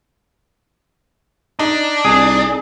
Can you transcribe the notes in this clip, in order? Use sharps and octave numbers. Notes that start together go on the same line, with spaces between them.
D4 D#4
C2 G#4